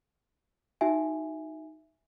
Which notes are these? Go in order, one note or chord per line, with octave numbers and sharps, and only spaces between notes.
D#4 F#4 E5 G#5